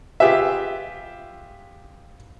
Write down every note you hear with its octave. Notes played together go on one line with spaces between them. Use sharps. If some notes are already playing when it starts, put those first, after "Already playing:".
F4 G4 G#4 B4 E5